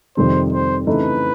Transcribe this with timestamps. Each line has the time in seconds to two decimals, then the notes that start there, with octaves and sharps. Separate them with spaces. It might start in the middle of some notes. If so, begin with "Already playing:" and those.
0.17 F2 C3 D#3 G3 C4 C5
0.53 C5
0.87 C#3 E3 A3 C4 D#4 B4